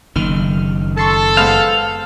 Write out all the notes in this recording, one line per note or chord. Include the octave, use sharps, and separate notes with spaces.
F#1 D#3 F6
A4 A5 C6 C#6
G#3 B3 C5 F5